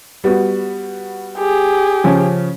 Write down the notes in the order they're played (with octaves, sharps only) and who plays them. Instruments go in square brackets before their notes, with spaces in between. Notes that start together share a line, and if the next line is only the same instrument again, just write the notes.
[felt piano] G3 B3 F#4
[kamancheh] G4 G#4
[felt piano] C#3 F3 C#4